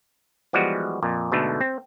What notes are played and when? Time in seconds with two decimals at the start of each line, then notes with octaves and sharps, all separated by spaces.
0.53 E3 F3 G3 G#3 B3 F#4
1.03 F2 A#2
1.32 G#2 B2 D3 A3
1.61 C4